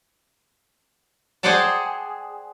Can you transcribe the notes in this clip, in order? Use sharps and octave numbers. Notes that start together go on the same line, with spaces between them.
G#4 C5 D5 F#5 G5 A5